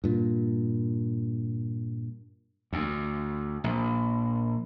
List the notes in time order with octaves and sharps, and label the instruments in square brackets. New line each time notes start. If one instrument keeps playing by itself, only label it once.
[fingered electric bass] G2 A#2
[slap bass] D2
A#1